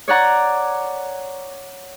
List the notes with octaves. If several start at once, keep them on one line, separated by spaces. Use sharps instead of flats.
C#5 D5 F#5 A#5